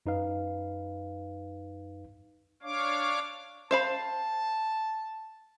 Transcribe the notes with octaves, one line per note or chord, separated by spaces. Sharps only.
F#2 D#4 B4 F5
D4 C#5 F5 D6
C5 F5 A5 B5